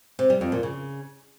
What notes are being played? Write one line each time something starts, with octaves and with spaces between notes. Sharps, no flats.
C3
G3
F2
A#2
C#3